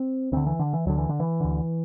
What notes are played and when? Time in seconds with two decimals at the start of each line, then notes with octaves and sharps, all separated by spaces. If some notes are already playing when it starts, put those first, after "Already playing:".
Already playing: C4
0.32 D2 D3 C4
0.46 E3
0.59 D3
0.73 E3
0.86 D2 D3 F#3
0.98 E3
1.09 D3
1.20 E3
1.41 D2 D3